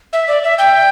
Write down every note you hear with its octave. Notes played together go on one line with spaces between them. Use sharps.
E5
D5
E5
G5